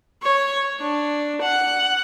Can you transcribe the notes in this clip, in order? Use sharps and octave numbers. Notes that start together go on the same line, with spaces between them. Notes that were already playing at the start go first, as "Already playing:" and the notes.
C#5
D4
F#5